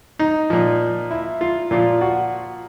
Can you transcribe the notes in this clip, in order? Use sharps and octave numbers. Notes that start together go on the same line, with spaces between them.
D#4
A#2 F3
E4
F4
A#2 F3 F4
F#4